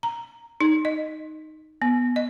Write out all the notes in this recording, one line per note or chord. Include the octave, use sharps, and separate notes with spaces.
A#5
D#4
D#5
B3
D#5